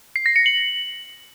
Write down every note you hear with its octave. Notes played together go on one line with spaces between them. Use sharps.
C7
A#6
C#7
F#7